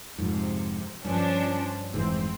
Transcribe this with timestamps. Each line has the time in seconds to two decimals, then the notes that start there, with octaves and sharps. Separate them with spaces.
0.18 F2 G#2 C3
1.05 G2 F3 C#4 D4
1.93 F1 G#2 E3 C4